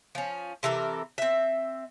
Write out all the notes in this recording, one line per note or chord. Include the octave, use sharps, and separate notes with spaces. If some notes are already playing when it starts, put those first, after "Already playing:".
F3 C#4
C3 E3 A4 A#4
C4 E5